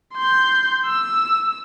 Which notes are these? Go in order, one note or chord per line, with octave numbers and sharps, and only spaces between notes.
C6 G6
E6